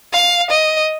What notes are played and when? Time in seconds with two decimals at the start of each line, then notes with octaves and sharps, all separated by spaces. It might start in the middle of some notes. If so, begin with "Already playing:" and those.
0.13 F5
0.51 D#5